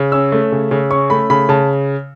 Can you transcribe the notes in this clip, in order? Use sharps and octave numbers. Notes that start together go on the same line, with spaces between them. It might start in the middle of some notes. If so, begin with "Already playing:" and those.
Already playing: C#3
C#4 E6
A3
C#3
C#3
C#4 C#6
A3 B5
C#3 B5
C#3 A5